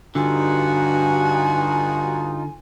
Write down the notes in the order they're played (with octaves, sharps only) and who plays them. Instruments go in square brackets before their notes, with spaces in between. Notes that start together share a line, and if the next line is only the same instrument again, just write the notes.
[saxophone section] G2 F#4 [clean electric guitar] D3 [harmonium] D#4 F4 [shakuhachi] G#5